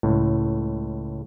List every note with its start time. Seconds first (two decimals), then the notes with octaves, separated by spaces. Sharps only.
0.03 C#2 A2